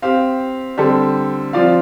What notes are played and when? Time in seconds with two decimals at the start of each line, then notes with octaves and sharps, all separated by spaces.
0.02 C4 G4 F5
0.78 D3 G3 C4 A4
1.53 F3 C4 F4 D5 F5